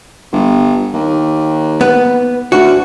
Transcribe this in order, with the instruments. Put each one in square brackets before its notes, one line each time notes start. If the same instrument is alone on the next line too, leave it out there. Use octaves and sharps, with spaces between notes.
[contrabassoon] G1
D#2
[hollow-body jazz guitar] B3
[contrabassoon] D2 [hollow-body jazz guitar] F#4